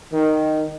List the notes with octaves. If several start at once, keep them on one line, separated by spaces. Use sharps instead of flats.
D#3